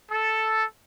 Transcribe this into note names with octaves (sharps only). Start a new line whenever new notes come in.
A4